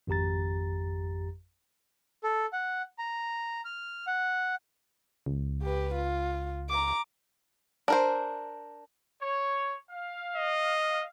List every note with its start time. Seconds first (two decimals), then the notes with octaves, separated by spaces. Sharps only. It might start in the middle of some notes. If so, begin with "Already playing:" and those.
0.07 G#1 F2 G4 A#5 A6
2.24 A4
2.53 F#5
2.99 A#5
3.65 F6
4.07 F#5
5.26 C#2
5.62 G4 B4
5.94 F4
6.69 A#5 D6
7.88 D4 A#4 C5
9.21 C#5
9.91 F5
10.36 D#5